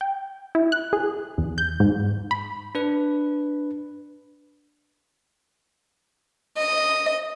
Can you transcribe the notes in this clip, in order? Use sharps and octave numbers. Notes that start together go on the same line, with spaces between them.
G5
E4
F#6
G#4
E2
G6
G#2
B5
D4 B4
D#5